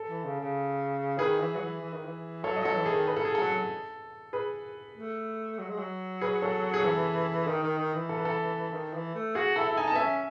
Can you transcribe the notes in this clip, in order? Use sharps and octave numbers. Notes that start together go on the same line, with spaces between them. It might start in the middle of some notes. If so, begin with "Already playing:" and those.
Already playing: A4
E3
C#3
C#3
D#3 G#4 B4
E3
F#3
E3
E3
D#3
E3
F#3 A4 C#5
F#3 D#5
A4 C#5
E3
G#4
D#3
B4
A4
G#4
F#3 A4
G#4 B4
A3
F#3
G#3
F#3
G#4 B4
A4 C#5
G#4
E3 A4
D#3
D#3
D#3
E3
A4
B4
A4
D#3
E3
A3
F#4 G#4
E4 A4
E4
D#4 G#5
A5
B3
C#4 E5 G#5